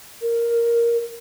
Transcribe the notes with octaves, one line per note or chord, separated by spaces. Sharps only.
A#4